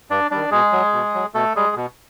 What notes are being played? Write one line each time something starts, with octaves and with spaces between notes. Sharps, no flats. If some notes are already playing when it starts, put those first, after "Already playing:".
G2 D4 D5
D#3 G3 D4 D5
B2 G#3 G#4
F#3
B2
F#3
B2 A3 A4
G3 G#3 G#4
B2